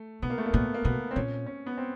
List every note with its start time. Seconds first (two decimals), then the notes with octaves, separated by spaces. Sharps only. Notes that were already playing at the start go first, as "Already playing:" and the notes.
Already playing: A3
0.22 B2 B3
0.30 A#3
0.38 A3
0.46 A#3
0.53 A#2 B3
0.74 A#3
0.84 B2 B3
1.11 C4
1.15 A#2 C#4
1.46 C#4
1.66 B3
1.77 C4